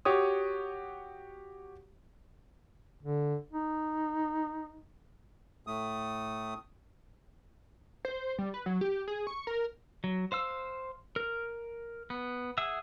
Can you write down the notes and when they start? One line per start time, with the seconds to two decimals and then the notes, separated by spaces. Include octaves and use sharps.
0.05 F#4 G4 C#5 D#6
3.03 D3
3.53 D#4
5.67 A2 A3 D#6
8.05 C5
8.38 G3
8.54 B4
8.66 F#3
8.81 G4
9.08 G#4
9.27 C#6
9.47 A#4
10.04 F#3
10.32 C5 F5 E6
11.16 A#4
12.10 B3
12.58 G#4 E5 F#5 E6